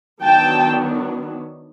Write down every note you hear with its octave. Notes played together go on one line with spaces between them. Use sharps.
D#3 F#3 B3 D4 G5 A5